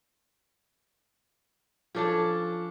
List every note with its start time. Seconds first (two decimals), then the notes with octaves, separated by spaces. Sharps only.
1.95 F3 C#4 D4 A4 C#5 A5